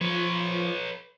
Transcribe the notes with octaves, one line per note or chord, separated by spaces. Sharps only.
F3 B4 C#5